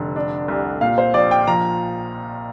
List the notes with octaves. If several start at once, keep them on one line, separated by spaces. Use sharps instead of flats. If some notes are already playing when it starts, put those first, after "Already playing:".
Already playing: F1 D3
D4
C2
A#2 F5
C5
A#1 D5
G5
F3 A#5